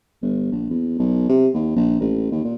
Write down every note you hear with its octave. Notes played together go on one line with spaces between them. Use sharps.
G1
A#1
E2
B1
C3
D#2
A#1
A1
D#2
A#2